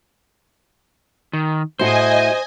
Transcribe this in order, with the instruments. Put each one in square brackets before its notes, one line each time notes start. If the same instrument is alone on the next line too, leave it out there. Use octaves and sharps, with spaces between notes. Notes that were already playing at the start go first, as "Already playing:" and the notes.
[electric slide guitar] D#3
[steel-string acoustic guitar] A2 E4 F#4 [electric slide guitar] C5 [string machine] D#5 G#5